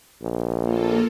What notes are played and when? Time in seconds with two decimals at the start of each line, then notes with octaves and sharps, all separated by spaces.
0.22 A#1
0.62 A#3 F4 A4